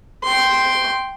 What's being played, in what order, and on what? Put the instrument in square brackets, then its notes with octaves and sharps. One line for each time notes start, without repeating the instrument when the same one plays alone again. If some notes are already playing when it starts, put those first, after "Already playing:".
[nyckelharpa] G5 C6